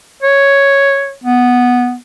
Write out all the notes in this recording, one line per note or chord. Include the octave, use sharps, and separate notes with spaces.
C#5
B3